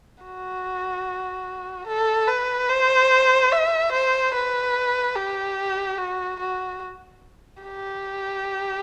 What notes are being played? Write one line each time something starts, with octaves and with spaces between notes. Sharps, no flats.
F#4
A4
B4
C5
E5
C5
B4
G4
F#4
F#4
G4